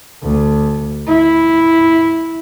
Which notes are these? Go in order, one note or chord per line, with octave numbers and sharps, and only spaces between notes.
D2
E4